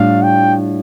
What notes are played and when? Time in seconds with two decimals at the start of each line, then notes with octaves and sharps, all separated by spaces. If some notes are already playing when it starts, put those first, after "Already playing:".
Already playing: A2 G3 D4 F4 F5
0.24 G5